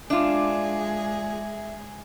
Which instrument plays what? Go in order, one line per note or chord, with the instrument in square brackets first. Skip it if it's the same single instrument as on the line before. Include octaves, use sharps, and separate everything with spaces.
[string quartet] G#3 G#4 [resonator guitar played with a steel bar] D4 F4 [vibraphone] E5